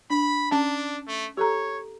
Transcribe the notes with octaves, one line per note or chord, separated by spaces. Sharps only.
D4 B5
C#4 D4 A5
A3
G4 A4 C#5 A#5